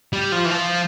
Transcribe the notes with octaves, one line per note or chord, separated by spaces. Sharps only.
G3
F3
E3
F3